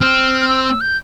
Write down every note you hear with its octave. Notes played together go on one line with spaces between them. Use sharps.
C4 F6
F6
E6
E6
G6